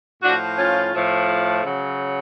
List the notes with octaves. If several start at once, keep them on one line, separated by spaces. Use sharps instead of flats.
A2 F3 D4 F#4
C#4 F4
A2 F3
C#3 F#3